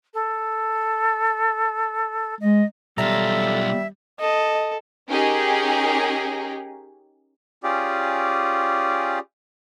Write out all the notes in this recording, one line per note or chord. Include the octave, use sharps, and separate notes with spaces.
A4
G#3 D#5
B1 G3 F4 A4 E5 A#5
A4 D#5
C#4 D#4 G4 G#4 A#4
C#4 F4 G4 G#4 D5